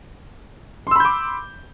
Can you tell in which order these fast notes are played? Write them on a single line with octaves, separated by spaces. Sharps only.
C6 E6 B5 G6 D6